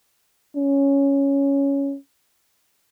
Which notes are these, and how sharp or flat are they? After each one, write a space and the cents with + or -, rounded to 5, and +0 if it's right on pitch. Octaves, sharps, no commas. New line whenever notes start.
C#4 +5